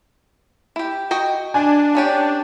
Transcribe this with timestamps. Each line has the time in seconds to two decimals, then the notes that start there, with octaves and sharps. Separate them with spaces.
0.76 E4 G4
1.11 F#4 D#5 G5
1.54 D4 G#5
1.95 B3 C#4 G4